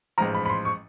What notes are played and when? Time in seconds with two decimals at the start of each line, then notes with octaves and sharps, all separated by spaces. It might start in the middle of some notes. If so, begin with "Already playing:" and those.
0.18 A1 G#2 F3 A#5
0.34 B5
0.46 B5
0.49 C6
0.65 C#6